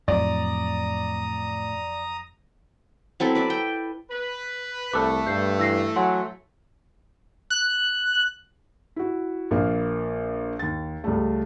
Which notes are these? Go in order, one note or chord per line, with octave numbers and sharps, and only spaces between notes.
F2 A2 F#3 D5 A#5 D#6
F#3 C4 E4 A4
B4 D5 E5
G5
B4
C2 A3 A4 B5 D6 F#6
G2 G6 C7
E3 E6 A#6 C7
F#3 F#5 G#5 C6
F#6
E4 F#4
A#1 A#3 F4 F5
D#2 A6
C#2 G3 A3